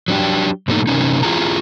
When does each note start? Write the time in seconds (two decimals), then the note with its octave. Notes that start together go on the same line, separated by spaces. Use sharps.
0.08 F#3 D4 G4
0.68 G#2 B2 G3 A3 A#3 D#4
0.87 C3 D#3 F#3 A#3 C#4 D#4
1.23 E4 F4 G#4 A#5